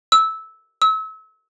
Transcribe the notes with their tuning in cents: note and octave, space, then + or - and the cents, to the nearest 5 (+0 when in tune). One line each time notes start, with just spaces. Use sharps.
E6 -15
E6 -35